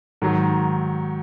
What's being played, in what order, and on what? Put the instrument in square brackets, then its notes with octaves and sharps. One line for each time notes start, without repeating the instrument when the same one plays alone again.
[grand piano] G#2 D#3 F#3